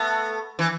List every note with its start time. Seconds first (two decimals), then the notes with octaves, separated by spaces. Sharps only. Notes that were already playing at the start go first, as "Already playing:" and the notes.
Already playing: A3 B3
0.59 E3